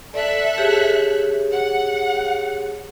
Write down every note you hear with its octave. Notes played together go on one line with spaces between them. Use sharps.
A4 D5 E5 F#6
G4 G#4 C#5
F#5